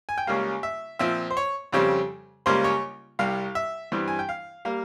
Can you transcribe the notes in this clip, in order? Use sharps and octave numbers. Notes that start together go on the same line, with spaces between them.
G#5
G5
C#2 C#3 G3 A#3 F5
E5
A#2 F3 C4 E5
C5
C#5
F2 C#3 G3 C4
C#2 C#3 G3 A#3 C5
C#5
C2 C3 G3 F5
E5
G2 E3 G3 C4
G#5
G5
F5
G3 A#3 F5